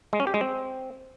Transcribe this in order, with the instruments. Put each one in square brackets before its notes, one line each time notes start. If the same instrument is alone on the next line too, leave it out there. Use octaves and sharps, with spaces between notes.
[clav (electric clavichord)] G#3
C#4
G4
G#3
C4